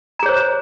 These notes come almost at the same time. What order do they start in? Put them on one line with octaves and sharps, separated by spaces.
A#5 G#4 C#5 C5